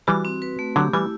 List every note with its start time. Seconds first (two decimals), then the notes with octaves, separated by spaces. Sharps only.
0.07 E3 G3 F#4
0.25 C4
0.42 B4
0.59 A3
0.76 D3 F#3 G4
0.93 E3 G3 E4